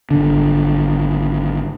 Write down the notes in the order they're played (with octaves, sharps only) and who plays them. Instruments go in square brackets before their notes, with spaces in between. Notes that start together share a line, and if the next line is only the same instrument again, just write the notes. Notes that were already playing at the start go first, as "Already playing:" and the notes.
[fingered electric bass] G#1 D3